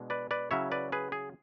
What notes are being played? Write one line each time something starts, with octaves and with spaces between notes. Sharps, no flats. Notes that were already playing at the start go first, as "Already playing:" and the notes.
Already playing: B2 G#3 D4
B4 D5
B4 D5
C#3 F#3 C#4 E4 C#5 E5
B4 D5
G#4 B4
G#4